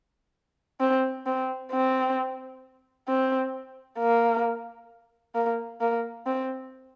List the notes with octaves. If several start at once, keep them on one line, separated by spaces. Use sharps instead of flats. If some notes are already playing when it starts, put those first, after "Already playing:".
C4
C4
C4
C4
A#3
A#3
A#3
C4